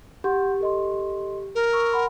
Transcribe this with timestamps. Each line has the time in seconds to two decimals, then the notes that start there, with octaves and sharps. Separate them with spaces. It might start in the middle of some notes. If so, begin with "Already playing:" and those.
0.24 G4 F#5 C6 G6
0.61 A4 D#5 C6
1.55 A#4
1.72 C#6 E6
1.92 F#5 B5 C6